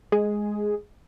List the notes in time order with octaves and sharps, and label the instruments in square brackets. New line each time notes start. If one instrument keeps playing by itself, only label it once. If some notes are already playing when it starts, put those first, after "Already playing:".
[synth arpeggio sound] G#3 G#4